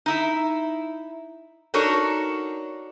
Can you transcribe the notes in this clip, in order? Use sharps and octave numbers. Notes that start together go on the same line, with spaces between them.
D#4 E4 E5
D4 D#4 F#4 A4 A#4 C#5